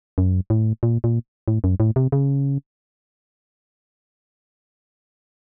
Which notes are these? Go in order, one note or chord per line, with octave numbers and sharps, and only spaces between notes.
F#2
A2
A#2
A#2
A2
F#2
A2
C3
C#3